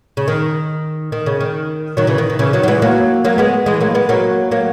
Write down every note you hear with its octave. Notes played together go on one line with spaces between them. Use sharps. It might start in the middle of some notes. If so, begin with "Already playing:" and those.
C#3
D#3
D#3
C#3
D#3
D#3 F#3
C#3 E3
D#3
D#3
C#3 E3
D#3 F#3
F#3
E3 G#3
F#3 A#3
F#3 A#3
G#3 B3
E3 G#3
F#3 A#3
G#3 B3
F#3 A#3
F#3 A#3